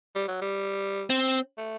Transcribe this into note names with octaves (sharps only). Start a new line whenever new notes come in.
G3
F#3
G3
C4
A3